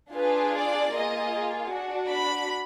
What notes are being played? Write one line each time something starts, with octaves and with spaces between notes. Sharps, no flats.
D4 F4 G#4 B4
D5
A#3 F4 G#4 D#5
D4 F#4
B5